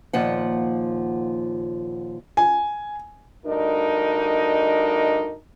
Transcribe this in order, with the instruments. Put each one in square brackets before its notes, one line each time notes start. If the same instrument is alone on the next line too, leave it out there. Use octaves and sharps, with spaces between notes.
[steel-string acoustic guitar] D#2 A#2 F3 F#5
[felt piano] G#5
[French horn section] D2 G2 D4 D#4 A#4 D#5